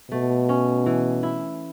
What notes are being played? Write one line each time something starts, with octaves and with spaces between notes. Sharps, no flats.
B2 A3
C#4
E3
E4